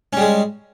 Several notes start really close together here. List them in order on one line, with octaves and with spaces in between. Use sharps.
C#4 G3 G#3